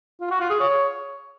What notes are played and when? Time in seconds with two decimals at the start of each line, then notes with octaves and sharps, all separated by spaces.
0.21 F4
0.30 F#4
0.40 F4
0.50 G#4
0.60 C#5